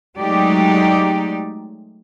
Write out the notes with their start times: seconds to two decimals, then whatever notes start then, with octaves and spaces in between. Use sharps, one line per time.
0.17 F#3 G#3 A3 D#4 G4 D5